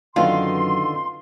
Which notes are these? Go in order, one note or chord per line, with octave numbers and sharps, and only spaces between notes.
F#2 D3 D#3 B3 F4 C6